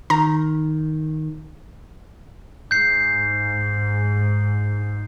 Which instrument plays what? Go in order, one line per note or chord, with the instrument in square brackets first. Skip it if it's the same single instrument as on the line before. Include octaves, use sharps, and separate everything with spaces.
[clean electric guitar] D#3 [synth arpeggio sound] A#5
[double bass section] G#2 [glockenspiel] G6 C7